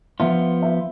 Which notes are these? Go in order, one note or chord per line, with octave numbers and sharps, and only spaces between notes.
F3 B3 F4 E5
E5